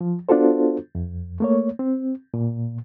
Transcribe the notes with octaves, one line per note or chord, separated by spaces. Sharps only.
F3
B3 D4 F4 F#4 A4 C5
F2
A3 A#3 C#5
C4
A#2